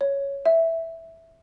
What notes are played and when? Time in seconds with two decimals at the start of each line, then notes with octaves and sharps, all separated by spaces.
0.01 C#5
0.46 E5